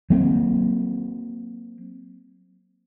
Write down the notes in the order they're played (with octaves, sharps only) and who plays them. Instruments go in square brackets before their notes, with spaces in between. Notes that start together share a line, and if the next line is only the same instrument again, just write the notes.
[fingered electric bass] F#3 A#3 C4